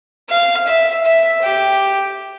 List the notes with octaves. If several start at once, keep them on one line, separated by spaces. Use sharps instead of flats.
F5
E5
E5
G4